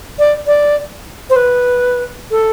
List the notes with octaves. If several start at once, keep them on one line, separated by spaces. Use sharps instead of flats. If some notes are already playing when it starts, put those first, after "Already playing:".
D5
D5
C5
B4
A4